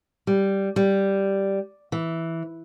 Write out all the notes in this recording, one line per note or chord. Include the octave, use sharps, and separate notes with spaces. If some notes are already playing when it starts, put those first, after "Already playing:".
G3
G3
E3